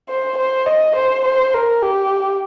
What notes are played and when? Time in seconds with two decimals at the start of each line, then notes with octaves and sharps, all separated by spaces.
0.09 C5
0.37 C5
0.66 D#5
0.95 C5
1.25 C5
1.54 A#4
1.82 G4